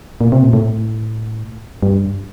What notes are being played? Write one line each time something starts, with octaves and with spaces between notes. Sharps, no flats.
A#2
C3
A#2
A2
G2